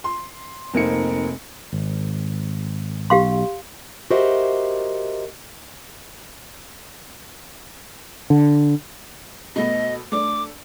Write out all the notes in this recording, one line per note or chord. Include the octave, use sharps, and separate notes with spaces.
C6
F1 A#3 C4 D#4 C#7
G#1
B1 G4 F5 C6
F#4 G4 A#4 C5 D#5 E5
D3
B2 A3 B3 D#5
A3 D4 D6